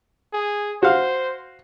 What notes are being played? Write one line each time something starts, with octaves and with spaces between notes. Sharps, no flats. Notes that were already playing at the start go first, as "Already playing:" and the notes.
G#4
F#4 C5 F5